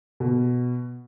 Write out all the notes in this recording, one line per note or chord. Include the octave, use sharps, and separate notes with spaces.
B2